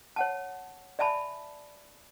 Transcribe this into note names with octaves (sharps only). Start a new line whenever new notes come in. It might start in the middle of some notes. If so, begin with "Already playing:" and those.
C#5 F#5 A5
D5 E5 G#5 A5 B5